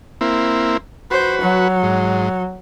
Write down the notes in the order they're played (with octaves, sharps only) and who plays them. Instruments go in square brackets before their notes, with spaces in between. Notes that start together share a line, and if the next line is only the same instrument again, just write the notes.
[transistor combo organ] A#3 C4 E4
[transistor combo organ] F#4 B4 [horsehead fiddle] C5
[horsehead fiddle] F#3
[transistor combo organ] G#2